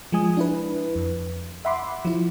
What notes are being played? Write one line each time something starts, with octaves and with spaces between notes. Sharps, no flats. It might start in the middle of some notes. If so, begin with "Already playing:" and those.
F3 G#3 G#5 D#6
D4 E4 B4
F2
E5 F#5 B5 C6 D6
F3 E4